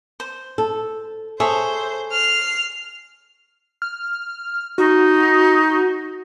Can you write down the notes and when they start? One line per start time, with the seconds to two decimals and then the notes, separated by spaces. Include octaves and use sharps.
0.20 C5
0.58 A4
1.40 G#4 A4 C5 C#5 E5 B5
2.12 F6 C7
3.82 F6
4.78 D#4 F#4